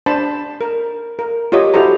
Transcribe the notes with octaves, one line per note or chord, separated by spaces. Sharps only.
D4 C5 A5 B5
A#4
A#4
F4 G4 C#5 D#5
E4 F#4 G4 A4 C5 A#5